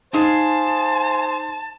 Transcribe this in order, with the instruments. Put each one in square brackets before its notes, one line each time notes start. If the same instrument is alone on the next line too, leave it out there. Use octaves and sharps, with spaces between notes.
[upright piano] D#4 [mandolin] F4 G#4 [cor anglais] C5 [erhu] A5